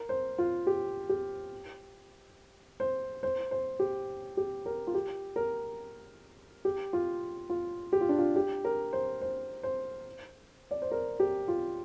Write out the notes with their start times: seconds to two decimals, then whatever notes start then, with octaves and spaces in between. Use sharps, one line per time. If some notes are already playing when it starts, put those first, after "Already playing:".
Already playing: A#4
0.09 C5
0.38 F4
0.67 G4
1.09 G4
2.80 C5
3.23 C5
3.51 C5
3.80 G4
4.37 G4
4.66 A#4
4.87 F4
4.94 G4
5.36 A#4
6.65 G4
6.93 F4
7.50 F4
7.93 G4
8.01 F4
8.09 D4
8.19 F4
8.36 G4
8.65 A#4
8.93 C5
9.21 C5
9.63 C5
10.71 D5
10.82 C5
10.91 A#4
11.20 G4
11.48 F4